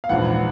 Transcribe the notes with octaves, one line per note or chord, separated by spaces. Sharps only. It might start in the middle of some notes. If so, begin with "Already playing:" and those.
F5
A#1 G#2 E3 F#5